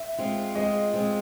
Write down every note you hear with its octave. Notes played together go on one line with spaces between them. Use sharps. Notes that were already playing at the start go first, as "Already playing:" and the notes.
Already playing: E5
G#3 C4 F4
G#3 C4 F4 D#5
G#3 C4 F4